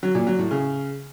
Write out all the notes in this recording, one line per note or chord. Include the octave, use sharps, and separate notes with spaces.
F#3
A#2
F#3
A2
C#3